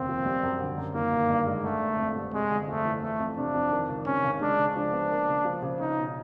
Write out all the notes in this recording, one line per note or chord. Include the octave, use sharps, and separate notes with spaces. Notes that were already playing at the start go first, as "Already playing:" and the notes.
Already playing: F1 D#2 C#3 C4
F3
G3
F#2
D3
F#2
D#3 A#3
G1
G2
G#3
D3 A3
G1
F2
G3
C3 G#3
G1
F2 A3
E3
E3 A3
F2
C3 D4
F2
D#3
C#2
C3 C#4
C#2
G#3 D4
C#3
F3 D4
B3
A#3
C#3
F3
C#3
C#4 D#4
B2